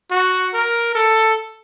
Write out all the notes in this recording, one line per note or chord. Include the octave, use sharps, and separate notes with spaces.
F#4
A#4
A4